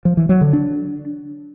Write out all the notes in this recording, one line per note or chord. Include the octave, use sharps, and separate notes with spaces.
F3
E3
F#3
D3
D4